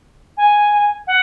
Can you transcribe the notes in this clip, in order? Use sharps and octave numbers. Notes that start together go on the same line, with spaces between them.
G#5
F#5